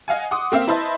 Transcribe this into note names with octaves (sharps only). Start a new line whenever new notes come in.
D#5 F5 F#5 G#5
F#5 C6 D6 D#6
A#3 C4 E5 F5
E4 B4 C5 D#5 E5 A5